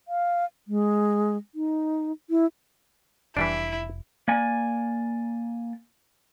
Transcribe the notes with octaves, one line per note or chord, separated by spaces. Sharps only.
F5
G#3
D#4
E4
F1 E3 G3 D4 E4 B6 C7 D7
A#3 D5 G#5